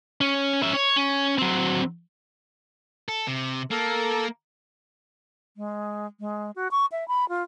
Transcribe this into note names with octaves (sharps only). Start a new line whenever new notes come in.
C#4
C#4 E5
C#5
C#4
F#3 C4
A4
C3
A#3 A4 A#4
G#3
G#3
F#4
C#6
E5
B5
F4